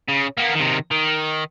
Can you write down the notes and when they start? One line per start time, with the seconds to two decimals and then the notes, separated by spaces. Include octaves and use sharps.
0.09 C#3
0.38 A#3 B3
0.55 C3 D#3
0.91 D#3